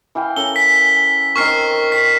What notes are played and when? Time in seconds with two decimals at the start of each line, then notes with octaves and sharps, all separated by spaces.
0.15 E3 F5 G5
0.36 C#4 A4 A#4 G7
0.56 B6
1.36 D#3 C4 A#4 C#6 F6 C7
1.92 C#6 B6